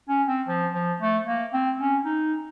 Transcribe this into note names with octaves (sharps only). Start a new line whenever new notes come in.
C#4
C4
F3
F3
A3
A#3
C4
C#4
D#4